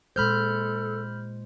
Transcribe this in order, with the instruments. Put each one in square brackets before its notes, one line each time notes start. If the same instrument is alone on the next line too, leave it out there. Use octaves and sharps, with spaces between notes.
[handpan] A#2 G#3 C5 [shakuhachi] A4 [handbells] B5 F6 G6